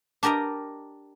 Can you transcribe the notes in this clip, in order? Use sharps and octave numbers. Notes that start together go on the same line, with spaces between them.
D4 G4 A#4 D#5 A#5